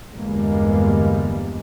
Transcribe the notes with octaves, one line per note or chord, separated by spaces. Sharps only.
G1 E2 G2 G3 G#3 A#3